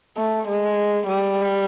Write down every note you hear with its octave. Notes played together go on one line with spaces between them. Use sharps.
A3
G#3
G3